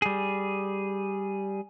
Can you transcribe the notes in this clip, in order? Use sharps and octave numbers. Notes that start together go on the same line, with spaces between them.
G3 G#4